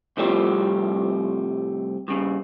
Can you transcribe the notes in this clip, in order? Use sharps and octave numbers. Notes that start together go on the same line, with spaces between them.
C2 A2 F3 G3
G2 C#3